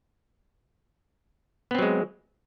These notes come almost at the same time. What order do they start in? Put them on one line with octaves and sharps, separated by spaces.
B3 C4 F#3 G#3